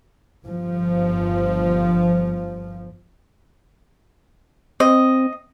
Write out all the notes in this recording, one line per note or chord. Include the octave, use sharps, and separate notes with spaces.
G1 F3
C4 D#5